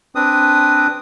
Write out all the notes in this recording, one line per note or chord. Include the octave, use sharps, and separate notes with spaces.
C4 D4 B4 D#6